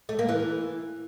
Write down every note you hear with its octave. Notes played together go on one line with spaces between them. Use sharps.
A3
A#3
E3